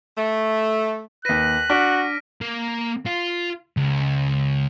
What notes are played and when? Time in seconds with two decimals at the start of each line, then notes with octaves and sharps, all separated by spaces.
0.18 A3
1.25 D#2 B4 F#6 A#6 B6 D#7
1.70 D4 F#4 F6 B6 D7
2.41 A#3
3.06 F4
3.77 C#2